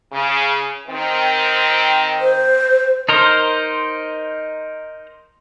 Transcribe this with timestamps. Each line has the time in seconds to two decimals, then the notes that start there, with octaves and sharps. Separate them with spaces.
0.12 C#3
0.87 D#3 C4
2.21 C5
3.09 D#4 A#4 C5